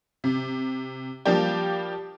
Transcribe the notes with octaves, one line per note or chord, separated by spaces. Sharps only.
C3
F3 G3 A#3 D4 G4